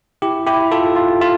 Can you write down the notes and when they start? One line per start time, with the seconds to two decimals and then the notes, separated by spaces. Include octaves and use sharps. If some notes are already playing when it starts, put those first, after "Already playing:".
0.22 E4 G4
0.47 E4 G4
0.71 F4 A4
0.96 F4
1.21 F4